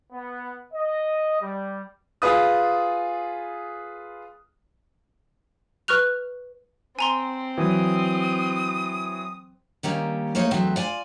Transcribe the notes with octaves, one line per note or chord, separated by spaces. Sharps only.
B3
D#5
G3
F4 G#4 B4 D#6
B4 C#6 F6 F#6 F7
C4 G#5 A#5 C6
E3 F#3 D#6
D#3 G3 A#3 C#4
A3 A#3 D#4 C#5
E2 E3 F#3 A3 C4 E5
F4 D5 G#5